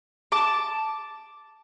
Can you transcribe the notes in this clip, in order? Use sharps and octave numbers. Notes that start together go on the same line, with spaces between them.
A5 D6